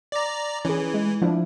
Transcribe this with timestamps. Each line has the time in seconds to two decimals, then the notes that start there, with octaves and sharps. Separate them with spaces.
0.12 D5 A#5
0.65 E3 C#4 G#4
0.94 G#3
1.22 F3 D4 E4